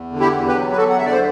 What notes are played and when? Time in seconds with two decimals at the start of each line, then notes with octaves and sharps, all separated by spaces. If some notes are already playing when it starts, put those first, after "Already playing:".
Already playing: E2
0.12 D3
0.20 E4 G4
0.34 E2
0.48 G4 B4
0.55 F#3
0.72 B4
0.77 E2 F#4 A4
0.90 F#5
0.98 D3 E5
1.06 D5
1.12 C5